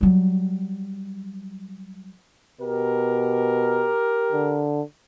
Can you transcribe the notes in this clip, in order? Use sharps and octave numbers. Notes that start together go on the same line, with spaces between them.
F#3 G3
B2 G4 A#4
D3